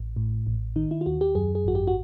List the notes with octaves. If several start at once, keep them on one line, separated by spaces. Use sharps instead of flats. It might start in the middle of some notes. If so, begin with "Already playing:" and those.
Already playing: A1
A2
A1
D#3 D#4
E4
F4
D#2 F#4
G4
F#2 G#4
G#4
G#1 F#4
G4
F#4